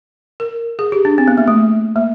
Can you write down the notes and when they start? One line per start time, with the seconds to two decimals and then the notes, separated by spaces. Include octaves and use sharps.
0.40 A#4
0.79 G#4
0.92 G4
1.05 D4
1.18 C4
1.28 B3
1.38 A#3
1.48 A3
1.96 A#3